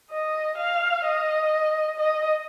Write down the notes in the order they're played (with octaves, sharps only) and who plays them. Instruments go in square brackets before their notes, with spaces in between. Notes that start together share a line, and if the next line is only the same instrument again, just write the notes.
[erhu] D#5
F5
D#5
D#5